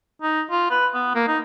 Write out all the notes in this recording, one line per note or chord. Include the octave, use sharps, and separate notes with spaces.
D#4
F4
B4
B3
A#3
D#4